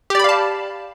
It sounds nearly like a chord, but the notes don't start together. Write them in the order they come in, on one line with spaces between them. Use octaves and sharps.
G4 D5 B5 F5 A5